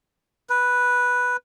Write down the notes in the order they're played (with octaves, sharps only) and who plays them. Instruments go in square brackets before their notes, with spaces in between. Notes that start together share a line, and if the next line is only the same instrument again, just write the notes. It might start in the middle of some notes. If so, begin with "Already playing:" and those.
[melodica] B4